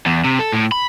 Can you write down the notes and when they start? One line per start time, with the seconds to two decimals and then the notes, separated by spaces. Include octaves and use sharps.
0.06 E2
0.24 C3
0.39 A4
0.53 A2
0.72 B5